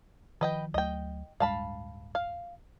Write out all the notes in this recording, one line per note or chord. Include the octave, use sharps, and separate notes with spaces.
D#3 F3 B4 D#5 G5
D2 F#3 A3 D#5 G5
D1 G2 G#3 F5 A5 B5
F5